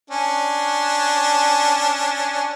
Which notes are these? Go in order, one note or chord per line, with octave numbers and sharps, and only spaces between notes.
C#4 D4